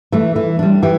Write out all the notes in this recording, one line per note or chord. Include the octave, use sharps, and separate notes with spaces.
E3 A3
E3
G3 D4
E3 G4